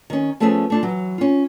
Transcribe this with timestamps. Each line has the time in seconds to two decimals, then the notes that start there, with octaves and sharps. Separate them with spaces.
0.10 D#3 C#4
0.40 F3 A3 B3 C#4 G#4 E5
0.70 A3 D4 F4
0.83 E3 F#3
1.18 C#4 F4